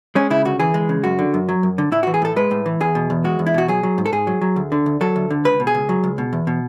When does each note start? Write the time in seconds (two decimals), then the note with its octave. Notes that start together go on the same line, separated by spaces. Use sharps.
0.15 G#3 C#4
0.30 C#3 E4
0.45 D2 F#4
0.60 E3 G#4
0.74 G#3
0.89 C#3
1.04 F#2 F#4
1.19 D3
1.34 F#2
1.49 F#3
1.63 F#2
1.78 D3
1.92 A2 E4
2.03 F#4
2.07 E3
2.14 G#4
2.22 A2 A4
2.36 G#3 B4
2.51 A2
2.66 E3
2.80 E2 G#4
2.95 B2
3.10 E2
3.24 G#3 F#4
3.39 E2
3.46 E4
3.54 B2 F#4
3.68 F#3 G#4
3.83 F#3
3.98 G#2
4.06 A4
4.12 G#2 G#4
4.27 F#3
4.41 F#3
4.56 D2
4.72 D3
4.86 D2
5.01 F#3 A4
5.16 D2
5.30 D3
5.45 C#2 B4
5.60 B2
5.67 G#4
5.75 C#2
5.89 F#3
6.04 C#2
6.18 B2
6.33 E2
6.47 B2